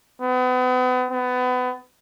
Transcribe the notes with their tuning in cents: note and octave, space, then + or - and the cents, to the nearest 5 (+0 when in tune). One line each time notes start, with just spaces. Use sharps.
B3 +35
B3 +25